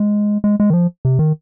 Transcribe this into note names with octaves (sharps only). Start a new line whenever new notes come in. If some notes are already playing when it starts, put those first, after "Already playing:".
Already playing: G#3
G#3
G#3
D#3
F3
C3
D#3